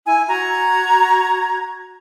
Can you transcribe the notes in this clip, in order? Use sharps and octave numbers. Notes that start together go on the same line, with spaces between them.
E4 G#5
F#4 A#5 G#6